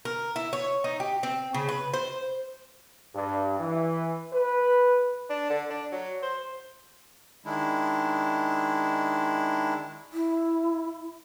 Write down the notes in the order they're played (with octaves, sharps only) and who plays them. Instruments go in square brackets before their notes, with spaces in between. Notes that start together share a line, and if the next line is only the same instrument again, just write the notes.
[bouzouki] A#4
E4
C#5
D#4
G4
C4
C#3
B4
C5
[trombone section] G2
E3
B4
[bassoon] D4
D3
D4
F#3
C5
[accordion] D#3 G#3 D4 E4
[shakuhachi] E4